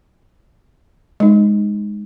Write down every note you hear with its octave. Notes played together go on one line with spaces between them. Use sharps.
G#3 D#4